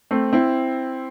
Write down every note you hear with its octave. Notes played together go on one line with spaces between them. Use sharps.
A3 C4
C4 E4